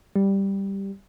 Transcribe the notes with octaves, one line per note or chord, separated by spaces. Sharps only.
G3